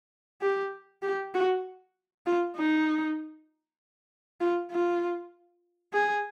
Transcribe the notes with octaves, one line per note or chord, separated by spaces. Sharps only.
G4
G4
F#4
F4
D#4
F4
F4
G#4